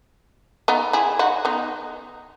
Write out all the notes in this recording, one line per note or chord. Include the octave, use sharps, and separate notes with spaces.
B3 D#4
E4 G#4
D#4 F#4
B3 D#4